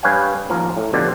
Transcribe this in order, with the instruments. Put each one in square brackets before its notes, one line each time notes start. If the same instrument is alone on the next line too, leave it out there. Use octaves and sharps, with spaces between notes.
[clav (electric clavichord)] G2 B4 C#5 F5 G5 G#5
A1 D#2 F3 A#4
A2
B2 D3 F3 C4 G4